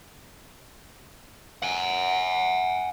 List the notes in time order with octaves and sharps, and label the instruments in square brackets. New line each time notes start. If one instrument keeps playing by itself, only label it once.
[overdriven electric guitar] F#5 G#5